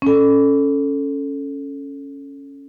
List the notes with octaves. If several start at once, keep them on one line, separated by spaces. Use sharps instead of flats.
C#4 A4